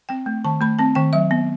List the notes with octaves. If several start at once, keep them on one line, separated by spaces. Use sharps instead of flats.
C4 G5
A3
D#3 A5
A3 B5
C4 A5
D#3 G5
F#3 E5
B3